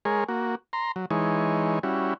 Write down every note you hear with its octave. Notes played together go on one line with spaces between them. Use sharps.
G#3 G#4 A#4 C#5
A#3 F#4
A#5 C6
F#3
E3 G#3 D#4 C#5
G3 C#4 E4 F#4